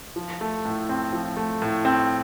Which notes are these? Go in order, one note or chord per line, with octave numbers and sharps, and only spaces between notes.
F3
A3
A2
C4
F3
A3
A2
C4